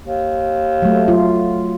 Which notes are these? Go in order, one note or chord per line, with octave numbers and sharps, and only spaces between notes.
D#2
F#3 A3
F#3 F4